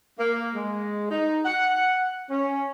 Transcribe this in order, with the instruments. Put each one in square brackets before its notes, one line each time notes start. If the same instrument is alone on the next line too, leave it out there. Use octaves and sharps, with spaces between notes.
[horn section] A#3
G#3
D#4
F#5
C#4